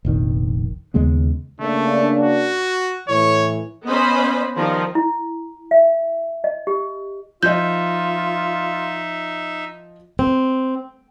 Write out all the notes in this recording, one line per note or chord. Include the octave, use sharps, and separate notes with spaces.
F1 A#1 D#3
D#2 C#3 G#3 B3
C#3 A3 A#3 D4
F#4
A2 E3 C#5
B3 C#4 B4 C5 D#5 B5
D#3 F3 G3 A#4
E4
E5
D#5
G4
F3 D#4 F4 D#5 E5 G6
C4